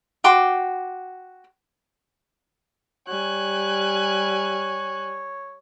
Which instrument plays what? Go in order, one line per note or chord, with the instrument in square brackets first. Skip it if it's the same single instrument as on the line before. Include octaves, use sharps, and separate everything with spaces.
[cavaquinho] F#4 G5 C6 D6
[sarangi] G3 [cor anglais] C#5 [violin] G#5 F#6